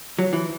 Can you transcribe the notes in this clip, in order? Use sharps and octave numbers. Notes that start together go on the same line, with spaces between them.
F#3
E3